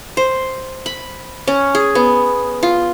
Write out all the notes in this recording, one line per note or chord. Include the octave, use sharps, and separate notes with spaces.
C5
B5
C#4
G#4
B3
F4